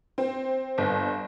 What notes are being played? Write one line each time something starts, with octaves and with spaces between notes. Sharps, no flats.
C4
G1